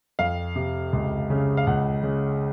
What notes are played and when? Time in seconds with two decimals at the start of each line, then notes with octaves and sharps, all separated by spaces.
0.19 F2 F5
0.56 C3
0.93 C#2
1.30 C#3
1.57 F5
1.67 C#2 F#5
2.03 C#3